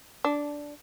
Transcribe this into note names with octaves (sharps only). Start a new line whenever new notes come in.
D4